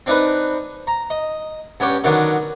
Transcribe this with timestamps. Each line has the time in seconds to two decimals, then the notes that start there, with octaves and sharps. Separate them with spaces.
0.06 C4 D4 D#4 B4
0.87 A#5
1.10 D#5
1.80 G2 B3 C#4 G5 D6
2.04 D3 D#3 F#3 B3 D4